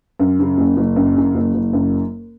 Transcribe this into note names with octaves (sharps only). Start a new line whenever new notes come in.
F#2
C#3
F#1
F#1
F#2
C#3
F#1
F#1
F#2